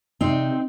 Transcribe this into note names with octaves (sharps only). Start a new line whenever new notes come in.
C3 C4 D#4